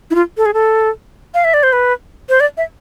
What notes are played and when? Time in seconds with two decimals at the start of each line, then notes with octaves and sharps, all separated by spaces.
0.11 E4
0.15 F4
0.37 A4
0.46 G#4
0.54 A4
1.34 F5
1.44 E5
1.54 D5
1.63 C5
1.73 B4
2.29 C5
2.40 D5
2.57 E5